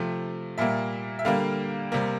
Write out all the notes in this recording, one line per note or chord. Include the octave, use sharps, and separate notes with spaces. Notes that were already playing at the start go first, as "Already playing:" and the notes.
Already playing: C3 F3 A3
A#2 G3 A#3 E5
E5
D3 G3 A#3 F5
C3 G3 A#3